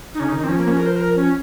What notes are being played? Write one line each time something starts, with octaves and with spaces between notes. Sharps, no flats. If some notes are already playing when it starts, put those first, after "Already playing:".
D#4
C#3 C#4
D#4
D#3
D#4
F3 C4 C#4
A#3
C#4
A#4
C5
A#4
C#4